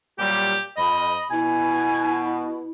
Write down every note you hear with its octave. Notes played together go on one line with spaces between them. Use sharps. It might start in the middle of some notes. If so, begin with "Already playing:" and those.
A#2 F#3 G3 G4
F2 D#5 B5
B2 E4 G#5